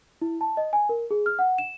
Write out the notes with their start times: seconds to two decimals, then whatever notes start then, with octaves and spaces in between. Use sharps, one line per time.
0.22 E4
0.41 A5
0.57 D#5
0.73 G#5
0.89 A#4
1.11 G#4
1.26 F6
1.39 F#5
1.58 E7